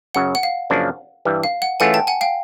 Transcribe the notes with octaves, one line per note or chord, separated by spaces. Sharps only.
F#2 C#3 F#3 F#5
F#5
F5
F#2 C#3 F3 A#3 D4
G2 E3 G3
F5
F#5
E3 A3 C#4 F4 G#4 F#5 G#5
G5 A5
F#5 G#5
F5 G5